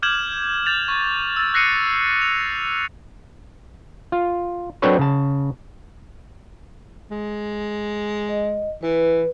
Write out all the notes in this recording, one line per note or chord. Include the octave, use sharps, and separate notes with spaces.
D6 F6 G6 G#6 E7 F#7
G6 A6 F7
C#6
E6 A6
E6 F#6 A#6 C7 C#7 D#7
F7
F4
F#3 C4 D4 A4 B4 C#5
C#3 A5
G#3
D#5
E3 B4